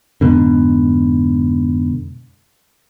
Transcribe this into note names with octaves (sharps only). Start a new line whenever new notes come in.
F2 G#2 B2 D3